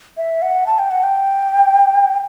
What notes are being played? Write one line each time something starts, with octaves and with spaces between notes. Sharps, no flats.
E5
F#5
A5
G5
F#5
G5